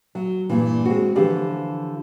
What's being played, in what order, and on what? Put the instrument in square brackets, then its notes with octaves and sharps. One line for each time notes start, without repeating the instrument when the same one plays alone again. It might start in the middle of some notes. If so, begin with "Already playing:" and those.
[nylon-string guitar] F#3
G2 A#2 E3
G#3 C4 F#4
D3 E3 F3 G4